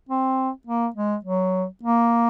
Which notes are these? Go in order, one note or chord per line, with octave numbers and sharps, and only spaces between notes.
C4
A#3
G#3
F#3
A#3